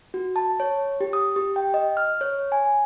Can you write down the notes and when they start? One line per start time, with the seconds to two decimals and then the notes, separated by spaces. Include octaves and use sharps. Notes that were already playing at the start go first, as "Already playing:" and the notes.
0.14 F#4
0.36 A5
0.60 C#5
1.00 G4
1.13 D#6
1.36 G4
1.56 G5
1.74 D#5
1.97 F6
2.21 C#5
2.52 G#5